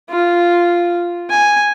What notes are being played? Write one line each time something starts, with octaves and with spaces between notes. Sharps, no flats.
F4
G#5